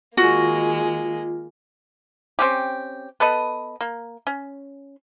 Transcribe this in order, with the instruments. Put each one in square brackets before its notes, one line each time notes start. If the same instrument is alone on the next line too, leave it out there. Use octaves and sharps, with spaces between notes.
[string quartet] D#3 G#3 A#3 [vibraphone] F4 [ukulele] F#4
[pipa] C4 C#4 G4
B3 A4 B4 D#5
A#3
C#4